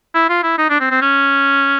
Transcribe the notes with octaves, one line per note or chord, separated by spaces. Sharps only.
E4
F4
E4
D#4
D4
C4
C4
C#4